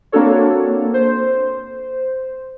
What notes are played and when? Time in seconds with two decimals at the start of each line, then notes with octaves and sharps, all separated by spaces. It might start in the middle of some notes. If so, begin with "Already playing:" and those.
0.12 A#3 C4 D4 F#4 A4 C#5
0.94 C5